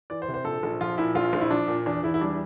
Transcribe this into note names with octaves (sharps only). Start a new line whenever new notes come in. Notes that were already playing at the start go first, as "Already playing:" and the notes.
E3 D5
C5
C3
C5
A#1 A4
A#1
F3 F4
A#2 E4
A#1 F4
A#1
E4
F3 D4
A#2
E2 D4
E2 E4
E4
G3 D4